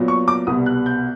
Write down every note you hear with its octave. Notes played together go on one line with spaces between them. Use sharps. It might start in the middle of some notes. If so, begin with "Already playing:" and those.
Already playing: A#2 F#3 B3
C#6
D6
C2 B2 G3 B3 D#6
F#6
G6